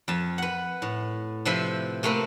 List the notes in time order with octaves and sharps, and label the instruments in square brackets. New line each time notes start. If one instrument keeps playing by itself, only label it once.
[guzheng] F2 A5
B4 F#5
A2
C3 F3 B4 C5 E5 B5
C3 A3 A#3 C4 B4